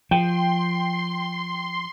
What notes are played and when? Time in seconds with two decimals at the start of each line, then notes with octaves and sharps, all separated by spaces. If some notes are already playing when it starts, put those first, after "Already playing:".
0.11 F3 G5 C6